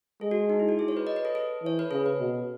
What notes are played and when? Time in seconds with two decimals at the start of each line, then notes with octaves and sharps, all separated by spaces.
0.21 G#3 A4
0.31 F#4
0.50 D#4
0.59 E4
0.69 F#4
0.79 G#4
0.88 C#5
0.97 B4
1.07 D#5
1.16 B4
1.25 A4
1.35 A4
1.63 E3 C#5
1.79 B4
1.91 C#3 A4
2.06 B4
2.20 B2